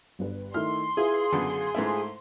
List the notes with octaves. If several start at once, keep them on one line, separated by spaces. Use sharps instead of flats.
G1 G2 B4
D#3 A3 E4 C6 F6
E4 F4 G#4 B4
F#2 D3 B3 F4
G#2 A3 E4